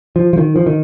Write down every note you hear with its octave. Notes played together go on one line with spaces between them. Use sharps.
F3
F3
D#3
F3
D#3